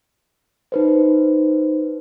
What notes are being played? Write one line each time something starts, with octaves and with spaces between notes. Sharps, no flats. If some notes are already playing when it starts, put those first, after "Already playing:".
D#4 B4 C5